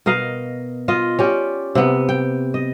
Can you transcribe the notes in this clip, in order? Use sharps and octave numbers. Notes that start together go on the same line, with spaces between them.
B2 A#4 D#5 F5
F4 D#5
C#4 G4 D5
C3 B3
G5
D#5